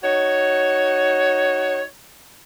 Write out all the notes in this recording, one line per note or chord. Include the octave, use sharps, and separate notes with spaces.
D#4 F#4 C#5